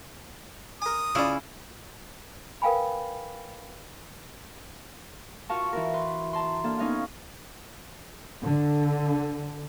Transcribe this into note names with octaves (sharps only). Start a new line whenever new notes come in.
A#4 G#5 D#6
C#3 E4 F4 D5
A#4 B4 F5 G5 G#5 B5
F4 F#4 A#4 F5 A5 C#6
E3 E4 F#4 A#4
B4 C6
A5 A#5 C6
A#3 D4 A4 F5
B3 C#4 D#4 C#5 F5
D3